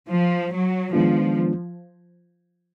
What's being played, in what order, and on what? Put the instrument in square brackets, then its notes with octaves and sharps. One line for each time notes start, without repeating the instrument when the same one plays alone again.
[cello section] F3
F#3
[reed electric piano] D#3 G#3 B3 D4 F4 [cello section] F3